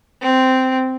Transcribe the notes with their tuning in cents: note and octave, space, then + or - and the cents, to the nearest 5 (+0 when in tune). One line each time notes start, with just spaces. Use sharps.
C4 -10